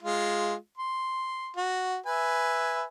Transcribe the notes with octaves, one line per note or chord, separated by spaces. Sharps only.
G#3 F4
C6
F#4
B4 E5 G#5